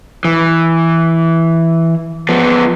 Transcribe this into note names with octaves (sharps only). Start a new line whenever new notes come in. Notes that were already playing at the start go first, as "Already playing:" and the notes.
E3
F3 B3